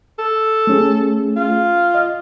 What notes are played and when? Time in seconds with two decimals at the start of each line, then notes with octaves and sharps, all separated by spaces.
0.19 A4
0.67 A3 C#4 G#4
1.37 F4
1.94 D#5